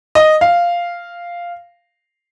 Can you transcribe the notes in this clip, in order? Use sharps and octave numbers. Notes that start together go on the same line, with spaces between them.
D#5
F5